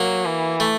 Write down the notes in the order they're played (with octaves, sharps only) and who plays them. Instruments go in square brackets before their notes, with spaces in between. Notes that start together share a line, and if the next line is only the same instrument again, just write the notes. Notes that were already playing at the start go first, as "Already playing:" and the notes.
Already playing: [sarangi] F#3 [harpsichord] A#3
[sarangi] E3
[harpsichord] A3